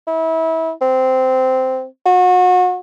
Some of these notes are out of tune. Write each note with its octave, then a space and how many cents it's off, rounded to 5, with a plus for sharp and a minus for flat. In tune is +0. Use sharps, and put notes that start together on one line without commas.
E4 -30
C4 -10
F#4 -30